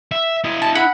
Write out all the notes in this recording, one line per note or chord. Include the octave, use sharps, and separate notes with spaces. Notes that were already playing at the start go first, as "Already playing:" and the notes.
E5
E4 D#5
A5
F#5 B5